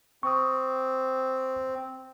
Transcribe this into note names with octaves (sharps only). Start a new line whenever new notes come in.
C4 C#6 D#6